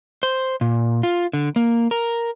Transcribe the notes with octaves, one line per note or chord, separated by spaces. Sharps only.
C5
A#2
F4
D3
A#3
A#4